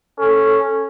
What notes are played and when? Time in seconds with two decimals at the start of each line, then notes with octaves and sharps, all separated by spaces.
0.19 C#4 A4